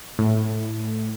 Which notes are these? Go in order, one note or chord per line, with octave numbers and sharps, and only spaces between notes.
A2